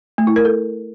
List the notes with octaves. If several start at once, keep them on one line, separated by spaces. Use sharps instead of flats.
A3
E4
A#4
A4